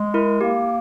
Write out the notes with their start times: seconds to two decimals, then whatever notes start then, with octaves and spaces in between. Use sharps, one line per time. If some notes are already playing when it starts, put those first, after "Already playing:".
Already playing: G#3
0.14 E4 A#4
0.41 A#3 G4